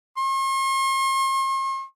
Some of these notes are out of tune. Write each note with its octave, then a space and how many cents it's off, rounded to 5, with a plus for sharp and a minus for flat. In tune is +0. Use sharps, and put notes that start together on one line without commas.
C6 +45